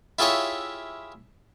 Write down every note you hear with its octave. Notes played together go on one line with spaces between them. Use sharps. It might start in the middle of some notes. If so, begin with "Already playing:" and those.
E4 F4 G4 G#4 C#5 E5